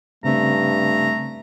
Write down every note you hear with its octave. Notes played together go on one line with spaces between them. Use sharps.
G2 C#3 A3 C4 A#5